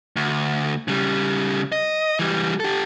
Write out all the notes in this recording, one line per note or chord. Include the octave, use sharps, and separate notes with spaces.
D2
C#3 G3
D#5
E3 G3
G4 A4